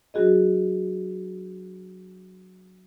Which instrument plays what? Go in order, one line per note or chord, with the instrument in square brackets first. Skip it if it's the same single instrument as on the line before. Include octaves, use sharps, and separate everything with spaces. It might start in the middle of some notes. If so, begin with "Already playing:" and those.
[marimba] F#3 D4 F4 F#4 G#4 D#5